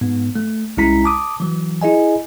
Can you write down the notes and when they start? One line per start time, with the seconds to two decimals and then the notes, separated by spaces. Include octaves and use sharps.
0.01 G#2 B3
0.36 A3
0.77 C2 G#3 C#4 E4 A#5 B6
1.04 A5 D6 D#6
1.40 E3 F#3
1.82 E4 G#4 D#5 G#5